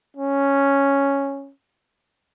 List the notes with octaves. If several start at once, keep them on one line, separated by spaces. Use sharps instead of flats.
C#4